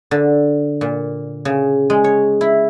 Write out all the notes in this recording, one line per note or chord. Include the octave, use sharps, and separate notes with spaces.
D3
A#2
C#3
G#3
C#5
E4